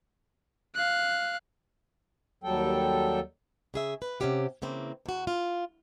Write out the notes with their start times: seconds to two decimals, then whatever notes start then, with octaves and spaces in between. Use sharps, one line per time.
0.75 F5 F#6
2.44 D#2 F#3 G3 A4 G5
3.74 C#3 G#4 E5
4.02 B4
4.20 C3 C4 C#4 F4 G4 F#5
4.62 C#3 E3 A#3 C4
5.06 E2 F#4
5.27 F4